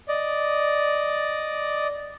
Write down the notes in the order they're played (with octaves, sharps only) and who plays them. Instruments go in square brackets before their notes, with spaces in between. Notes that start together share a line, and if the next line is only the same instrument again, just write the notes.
[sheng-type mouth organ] D5 D#5